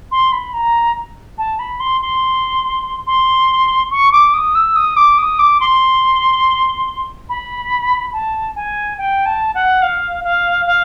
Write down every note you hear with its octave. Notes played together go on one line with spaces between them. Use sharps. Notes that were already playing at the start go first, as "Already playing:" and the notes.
C6
B5
A#5
A5
B5
C6
C6
C6
C#6
D6
D#6
E6
D#6
D6
D#6
D6
C6
B5
A5
G#5
G5
A5
F#5
F5
F5
F5